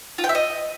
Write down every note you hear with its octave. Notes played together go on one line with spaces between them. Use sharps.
F4
G5
E5
D#5